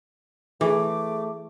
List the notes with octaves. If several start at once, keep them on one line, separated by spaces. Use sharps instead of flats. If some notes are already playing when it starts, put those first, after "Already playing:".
E3 A3 G#4 D6